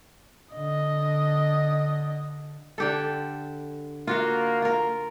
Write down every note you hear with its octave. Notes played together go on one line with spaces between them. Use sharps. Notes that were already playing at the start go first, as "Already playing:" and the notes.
D3 D#5
D3 G4 A4
A#3 F4 F#4 F5
F4 A#4